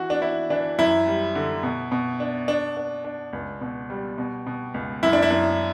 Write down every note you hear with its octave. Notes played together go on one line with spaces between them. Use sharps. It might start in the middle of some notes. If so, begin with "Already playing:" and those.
Already playing: E3 F#4
D4
D4 E4
E3 D4
F#2 E4
G3
D3
B2
B2
D4
D4
D4
D4
C#2
B2
G3
B2
B2
C#2
F#2 E4
D4
E4
F#2